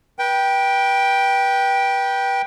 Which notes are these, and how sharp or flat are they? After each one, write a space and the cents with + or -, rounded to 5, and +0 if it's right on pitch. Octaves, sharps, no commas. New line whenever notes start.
B4 -30 G5 +0